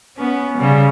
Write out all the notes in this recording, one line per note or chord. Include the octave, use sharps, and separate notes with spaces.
B3 C#4
C#3 G3